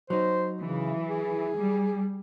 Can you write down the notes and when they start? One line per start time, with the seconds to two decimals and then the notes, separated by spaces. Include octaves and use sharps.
0.10 F#3 D#4 C5
0.61 C#3 E3
1.09 G#4
1.56 G3